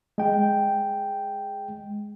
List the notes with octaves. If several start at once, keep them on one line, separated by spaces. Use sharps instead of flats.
G#3 G5